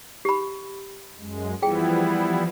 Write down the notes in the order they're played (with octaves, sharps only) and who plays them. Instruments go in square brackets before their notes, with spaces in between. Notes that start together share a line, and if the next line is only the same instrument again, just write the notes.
[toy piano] G4 B5
[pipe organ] F#2 G#3
[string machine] E3 F3 [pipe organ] G3 B3 E4 [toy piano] G#4 G5